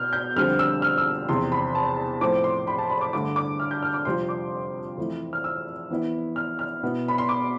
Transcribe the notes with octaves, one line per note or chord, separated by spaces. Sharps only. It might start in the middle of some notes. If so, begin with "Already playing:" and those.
Already playing: B2 B3 F6 G6
G6
F2 D3 G3 C4 F6
E6
F6
E6
E2 C3 F3 C6
B5
A5
A2 F3 C4 D6
C6
B5
A5
B5
D6
G2 D3 A3 D6
D6
F6
G6
F6
D6
F2 C3 G3 C4 F4 C6
D6
F2 E3 A3 E4
F6
E6
E3 B3 E4
F6
F6
B2 B3 E4
B5
C6
D6